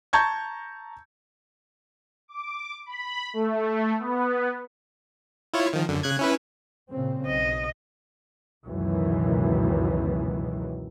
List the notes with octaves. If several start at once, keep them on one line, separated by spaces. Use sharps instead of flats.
A5 A#5 C#6 G6 G#6
D6
B5
A3
B3
E4 F4 C#5
D#3 F3
F#2 D3
C#3 F#6 G#6
C#4 E4 B4
A#2 C#3 C4
B1 D#5
C#2 F#2 B2 D#3 E3